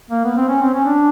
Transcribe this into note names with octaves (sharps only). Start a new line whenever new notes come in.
A#3
B3
C4
C#4
C4
C#4
D4